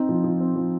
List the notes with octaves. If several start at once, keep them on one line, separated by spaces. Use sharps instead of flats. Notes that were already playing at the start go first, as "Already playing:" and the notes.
Already playing: C4 D#4
F3
F3
C4
F3